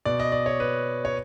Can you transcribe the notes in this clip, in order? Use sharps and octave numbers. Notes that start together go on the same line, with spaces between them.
B2 D5
D#5
D5
C#5
B4
C#5